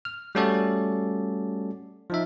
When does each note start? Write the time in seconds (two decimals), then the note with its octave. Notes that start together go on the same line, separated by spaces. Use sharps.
0.05 F6
0.35 G3 A3 C#4 F#4 A4 D5
2.10 F3 D#4 E5